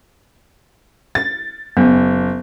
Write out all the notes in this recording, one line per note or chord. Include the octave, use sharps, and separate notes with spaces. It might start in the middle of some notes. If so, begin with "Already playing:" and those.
A6
F#1 B3